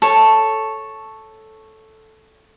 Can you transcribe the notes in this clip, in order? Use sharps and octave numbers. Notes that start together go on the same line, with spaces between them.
A4 C#5